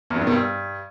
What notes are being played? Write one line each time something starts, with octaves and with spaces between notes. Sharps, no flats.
E2
F#2
D#3
B2
G2